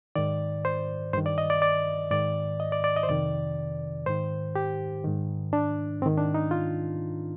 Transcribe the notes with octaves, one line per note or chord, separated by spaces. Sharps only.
G#2 D#3 D5
C5
G2 D#3 C5
D5
D#5
D5
D5
G#2 D#3 D5
D#5
D5
D5
D#5
C5
F2 C3 D#3 D5
G#2 D#3 C5
G4
G#2 D#3
D4
G#2 D#3 C4
D4
D#4
F4